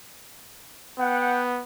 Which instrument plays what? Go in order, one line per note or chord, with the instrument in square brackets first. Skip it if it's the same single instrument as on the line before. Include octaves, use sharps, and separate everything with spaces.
[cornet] B3 [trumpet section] F#5 G5